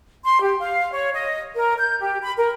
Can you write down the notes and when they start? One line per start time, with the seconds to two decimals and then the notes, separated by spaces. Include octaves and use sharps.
0.24 C6
0.41 G4
0.59 F5
0.93 C#5
1.14 D#5
1.55 A#4
1.79 G6
2.00 G4
2.23 B5
2.37 A#4